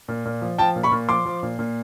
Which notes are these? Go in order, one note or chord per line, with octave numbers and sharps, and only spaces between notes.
A#2
A#2
F3
F3 G5 A5
A#2
B5 C#6
A#2
F3 C6 D6
F3
A#2
A#2